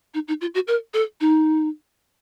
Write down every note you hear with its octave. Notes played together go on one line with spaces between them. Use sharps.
D#4
D#4
F4
F#4
A#4
A4
D#4